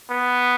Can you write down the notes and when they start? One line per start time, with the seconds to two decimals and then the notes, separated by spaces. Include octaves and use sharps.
0.11 B3